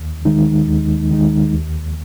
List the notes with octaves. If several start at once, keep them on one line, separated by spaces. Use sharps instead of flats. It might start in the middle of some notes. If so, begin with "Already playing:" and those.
Already playing: D#2
D#3 G#3 D#4
D#2
D#3 G#3 D#4
D#2